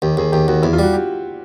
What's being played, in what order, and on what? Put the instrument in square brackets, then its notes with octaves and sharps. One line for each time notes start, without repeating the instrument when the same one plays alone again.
[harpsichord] D#2 [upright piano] G4
[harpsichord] D#2 [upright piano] G#4
[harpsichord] D#2 [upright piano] G4
[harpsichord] D#2 [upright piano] F#4
[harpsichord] E2 [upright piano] E4
[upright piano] F4
[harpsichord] G3 [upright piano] F#4
[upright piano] G4